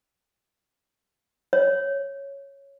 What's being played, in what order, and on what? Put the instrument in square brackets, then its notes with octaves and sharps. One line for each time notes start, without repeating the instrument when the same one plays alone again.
[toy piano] C#5